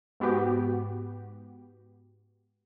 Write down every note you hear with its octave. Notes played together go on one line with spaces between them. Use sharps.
G#2 B3 F#4 G4